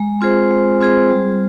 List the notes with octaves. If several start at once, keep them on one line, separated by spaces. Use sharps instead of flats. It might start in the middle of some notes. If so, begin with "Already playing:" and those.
Already playing: G#3
C4 F4 G#4 C5
G#3
C4 F4 G#4 C5
G3